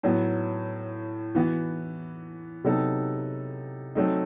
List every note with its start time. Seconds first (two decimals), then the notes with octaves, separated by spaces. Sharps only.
0.03 A2 F#3 B3
1.35 E3 B3 F#4
2.64 C3 F#3 B3 D#4 A4
3.95 F#3 A3 C4 D#4